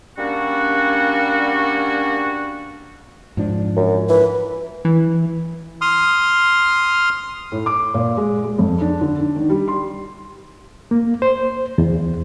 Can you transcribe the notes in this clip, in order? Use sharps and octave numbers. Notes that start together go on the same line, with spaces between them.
G3 A#3 C#4 D4 F#4
G#2 F3 D4
F#2
E3 B4
E3
C6 D#6 F6
A2
D6
A#2
G#3
G#3
F2
D4
D3
D4
D#3
G3
C6
A#3
C5
E2